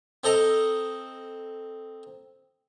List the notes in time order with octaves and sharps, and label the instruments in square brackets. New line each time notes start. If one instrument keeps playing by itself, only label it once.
[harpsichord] C4 A4 D#5 A#5